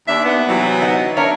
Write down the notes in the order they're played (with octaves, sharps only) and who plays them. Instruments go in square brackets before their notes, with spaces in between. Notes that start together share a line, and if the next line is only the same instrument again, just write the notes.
[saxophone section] D#2 D4 [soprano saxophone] E5
[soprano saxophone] B3
[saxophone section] C3 E3 F#3
[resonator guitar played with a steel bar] D#4 D#5 F#5
[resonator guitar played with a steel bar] D4 E5 [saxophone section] A#4 C#5